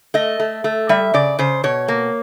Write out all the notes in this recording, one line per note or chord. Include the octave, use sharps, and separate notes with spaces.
A3 D#5
A3
A3
G3 E5
C#3 D5
C#3 C5
B2 C#5
A#3